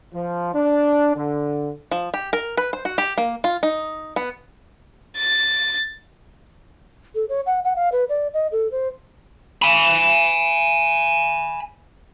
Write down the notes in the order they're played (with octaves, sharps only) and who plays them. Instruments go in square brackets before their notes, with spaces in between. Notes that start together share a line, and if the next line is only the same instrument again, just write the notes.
[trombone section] F3
D4
D3
[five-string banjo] F3
G4
A#4
B4
C5
F#4
G4
A#3
F4
D#4
B3
[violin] A6
[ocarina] A4
C#5
F#5
F#5
F5
B4
D5
D#5
A4
C5
[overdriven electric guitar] G#5 B5